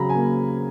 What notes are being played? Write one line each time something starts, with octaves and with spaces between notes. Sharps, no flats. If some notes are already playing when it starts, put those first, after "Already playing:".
Already playing: C#3 F#3 C#4 A#5 B5
G#5
A#3